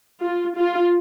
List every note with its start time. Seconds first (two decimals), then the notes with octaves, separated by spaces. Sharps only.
0.23 F4
0.57 F4